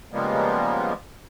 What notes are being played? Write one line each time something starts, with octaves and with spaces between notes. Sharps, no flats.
C#3 F3 G3 G#3 A#3 B3